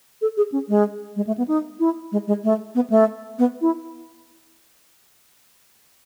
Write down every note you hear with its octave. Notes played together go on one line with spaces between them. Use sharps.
A4
G#4
C#4
G#3
G#3
A3
B3
D#4
E4
G#3
G#3
A3
B3
A3
B3
E4